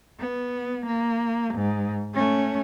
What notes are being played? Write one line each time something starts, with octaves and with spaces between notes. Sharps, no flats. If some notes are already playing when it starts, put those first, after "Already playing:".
B3
A#3
G#2
A3 C#4